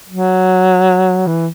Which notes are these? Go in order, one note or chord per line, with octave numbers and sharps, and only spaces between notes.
F#3
E3